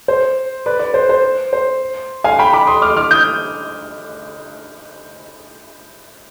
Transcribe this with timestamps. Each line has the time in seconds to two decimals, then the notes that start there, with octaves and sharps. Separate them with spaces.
0.08 C5
0.66 B4 D5
0.79 B4 D5
0.94 C5
1.09 C5
1.53 C5
2.24 F5 G#5
2.39 G5 B5
2.53 B5 D6
2.67 C6 D#6
2.82 D6 F6
2.97 D6 F6
3.11 D#6 G6